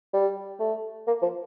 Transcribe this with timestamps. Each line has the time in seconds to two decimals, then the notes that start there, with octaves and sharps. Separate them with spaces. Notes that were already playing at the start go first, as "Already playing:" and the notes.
0.13 G3
0.60 A3
1.07 A#3
1.22 F3